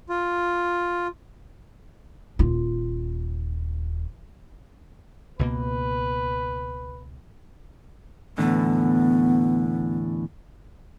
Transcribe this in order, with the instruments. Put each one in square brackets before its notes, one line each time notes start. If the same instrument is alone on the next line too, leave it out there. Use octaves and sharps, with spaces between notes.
[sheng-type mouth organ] F4
[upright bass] D#1 F4
[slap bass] C#2 B2 A#3 [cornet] B4
[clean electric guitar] E2 A2 D3 [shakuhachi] B3